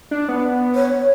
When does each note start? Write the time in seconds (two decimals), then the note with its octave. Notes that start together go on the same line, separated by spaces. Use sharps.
0.11 D4
0.28 B3
0.75 C#5